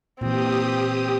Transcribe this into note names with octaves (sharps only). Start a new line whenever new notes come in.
A#2 E3 C4 G4 D#6